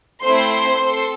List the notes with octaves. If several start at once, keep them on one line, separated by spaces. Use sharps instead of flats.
A3 C4 E4 C5 C6
C4 A4